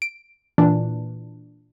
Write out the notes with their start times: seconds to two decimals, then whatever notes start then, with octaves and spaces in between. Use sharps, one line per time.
0.02 D7
0.58 A#2 E3 D4